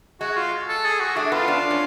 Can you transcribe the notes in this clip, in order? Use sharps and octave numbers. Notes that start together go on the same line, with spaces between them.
G#3 F#4
F4
A4
G#4
F#4
A3 D4
B3 F4
D4
C#4